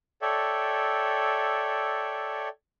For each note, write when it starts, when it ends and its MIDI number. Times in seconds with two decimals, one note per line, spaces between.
0.22 2.49 69
0.22 2.49 73
0.22 2.49 74
0.22 2.49 76
0.22 2.49 79